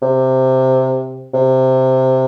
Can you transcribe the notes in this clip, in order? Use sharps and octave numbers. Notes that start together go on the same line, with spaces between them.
C3
C3